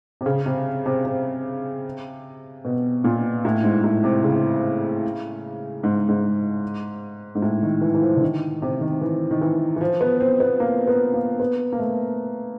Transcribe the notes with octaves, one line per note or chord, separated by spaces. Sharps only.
C3
C#3
C3
C3
C3
B2
A#2
A2
G#2
A2
C3
C#3
G#2
G#2
G#2
A2
D#3
E3
E3
F3
D3
D#3
C3
D#3
E3
D#3
E3
E3
F3
B3
C4
B3
A#3
B3
A#3
B3
A#3
A3